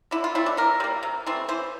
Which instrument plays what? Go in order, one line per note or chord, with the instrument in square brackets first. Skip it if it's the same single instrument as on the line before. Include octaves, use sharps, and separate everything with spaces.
[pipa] D3 E4
F4
A3 C4 E4
D4
E3 A#4
G3 A#3
C3
E3 A3 C4
E3 C5